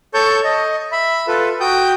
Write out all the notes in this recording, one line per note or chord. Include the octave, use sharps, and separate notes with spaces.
A4 C#5 A5 C#6 G6
D#5
E5 B5
F4 A4 B4
F#4 G5 D#6 G6